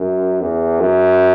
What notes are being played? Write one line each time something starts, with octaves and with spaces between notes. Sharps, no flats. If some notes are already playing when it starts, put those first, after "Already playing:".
Already playing: F#2
E2
F#2